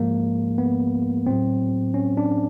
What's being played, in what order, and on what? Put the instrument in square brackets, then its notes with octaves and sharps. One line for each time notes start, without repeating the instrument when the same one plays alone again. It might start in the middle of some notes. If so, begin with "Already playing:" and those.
Already playing: [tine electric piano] G#2 F3 G#3 A#3
B3
A2 F#3 C4
C#4
D4